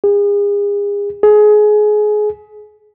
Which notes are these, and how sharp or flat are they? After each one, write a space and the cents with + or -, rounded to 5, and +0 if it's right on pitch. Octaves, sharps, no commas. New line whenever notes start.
G#4 -35
G#4 +25